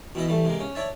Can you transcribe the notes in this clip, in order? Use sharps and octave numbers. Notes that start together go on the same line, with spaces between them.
B2 E3 E4 D#5
E3 G3 A3
C3 G#3 A#3
C#4
D4 C#5 E5 A5